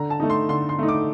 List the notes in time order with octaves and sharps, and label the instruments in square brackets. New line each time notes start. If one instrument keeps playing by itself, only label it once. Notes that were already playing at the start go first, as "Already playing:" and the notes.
Already playing: [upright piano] D3 A#5
A5
A3 D#4
C6
D3 C6
C6
A3 D#4
D6